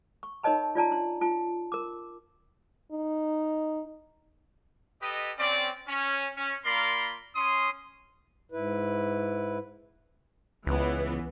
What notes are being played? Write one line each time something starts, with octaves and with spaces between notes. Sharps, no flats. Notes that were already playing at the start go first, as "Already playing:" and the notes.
C#6
D#4 A#4 C#5 D#5 A5 B5
F4 D5 A5 A#5
D4 C6
F4 A5
A#4 D6
D#4
G4 A4 B4 D#5
C4 C#4 D5
C#4
C#4
A#3 F4 A#4 D5 B5 C6
C#4 C6 D#6
G#2 E4 B4
C#2 E3 B3